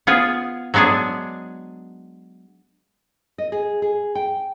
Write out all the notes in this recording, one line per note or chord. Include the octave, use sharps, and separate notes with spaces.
B3 F4 G#4
F#3 G#3 B3 D4 G#4
D#5
G#4
G#4
G5